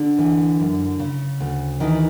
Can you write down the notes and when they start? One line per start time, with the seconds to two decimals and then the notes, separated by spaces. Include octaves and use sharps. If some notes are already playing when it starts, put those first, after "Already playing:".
Already playing: D3 D4
0.19 E3
0.60 F#2
0.99 C#3
1.40 D2
1.80 D#3 E3 D#4